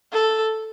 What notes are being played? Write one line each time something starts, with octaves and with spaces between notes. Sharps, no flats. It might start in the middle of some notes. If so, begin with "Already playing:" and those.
A4